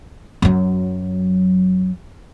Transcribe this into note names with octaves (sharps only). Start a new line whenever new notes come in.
F#2 F#3